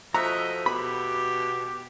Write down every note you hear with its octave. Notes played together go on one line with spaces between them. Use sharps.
F3 A3 F#4 D#5 E5 A#5
B2 G4 B5